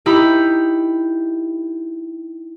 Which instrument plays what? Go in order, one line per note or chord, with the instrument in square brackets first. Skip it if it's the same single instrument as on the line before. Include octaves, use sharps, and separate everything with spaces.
[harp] D#4 E4 G4 B5